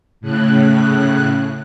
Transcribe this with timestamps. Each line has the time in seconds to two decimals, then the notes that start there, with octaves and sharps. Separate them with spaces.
0.21 A2 C#3 F#6